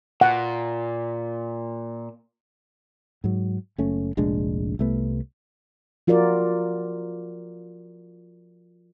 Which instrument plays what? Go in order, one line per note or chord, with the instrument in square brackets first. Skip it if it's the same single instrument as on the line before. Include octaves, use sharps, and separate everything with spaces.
[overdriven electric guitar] A#2 [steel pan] F#5
[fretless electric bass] G#2 F#3
F#1 A3 C#4
F1 A#1 G#3 D4
C2 A3 B3
[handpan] F3 F4 F#4 A#4 D5